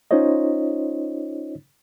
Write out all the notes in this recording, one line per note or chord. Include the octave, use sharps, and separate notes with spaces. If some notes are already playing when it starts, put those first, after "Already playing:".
C#4 D#4 F4 C5 C#5 D#5